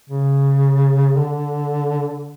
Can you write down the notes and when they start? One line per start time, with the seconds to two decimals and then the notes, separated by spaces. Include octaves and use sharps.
0.09 C#3
1.17 D3